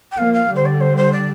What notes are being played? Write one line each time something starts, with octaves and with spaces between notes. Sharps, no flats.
G5
F3 A#3 F5
F5
D3 G3
C5
D5
C5
C5
D5